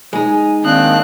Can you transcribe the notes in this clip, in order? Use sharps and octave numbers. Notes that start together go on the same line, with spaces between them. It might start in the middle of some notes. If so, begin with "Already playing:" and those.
G#3 D#4 G#5
D#3 A#3 C4 D4 D#6 F#6